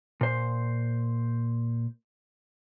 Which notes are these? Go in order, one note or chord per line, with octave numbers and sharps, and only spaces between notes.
A#2 C5